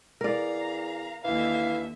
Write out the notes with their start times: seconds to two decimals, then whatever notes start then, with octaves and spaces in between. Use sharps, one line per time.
0.21 E2 A#4 D5 F5 A#5
1.24 D#2 D3 E3 E5 F5